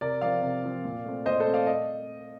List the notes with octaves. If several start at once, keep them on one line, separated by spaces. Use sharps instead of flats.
C3 A#4 D5
F3 C4 D5 F5
C3
F3 C4
A#2
A3 C4
A#2 C5 D#5
A4 C5
A3 C4
D5 F5
D#5